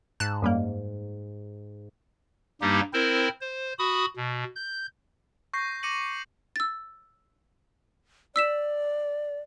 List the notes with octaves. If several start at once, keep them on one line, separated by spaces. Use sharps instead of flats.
G#2 A5 F#6
F#2 G3 A#3
G2 G3 A#3 D#4 G4
C4 E4 A#4 C5
C5
F#4 B5 D#6
B2
G6
C#6 G6 A#6 C7
D6 A#6 C#7 D#7 F#7
E6 A6
D5 E6 B6 E7